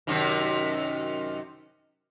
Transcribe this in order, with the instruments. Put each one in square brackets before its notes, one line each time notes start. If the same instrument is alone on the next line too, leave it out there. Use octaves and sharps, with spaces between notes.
[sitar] F#2 C3 D#3